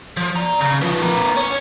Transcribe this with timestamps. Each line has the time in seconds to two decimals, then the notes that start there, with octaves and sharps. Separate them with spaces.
0.17 F3
0.36 D5 A#5
0.61 C#3
0.82 F3 B3
1.02 B3 A#4
1.36 C#4